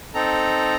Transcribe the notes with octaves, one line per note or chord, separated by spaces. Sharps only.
C4 D#4 A4 A#5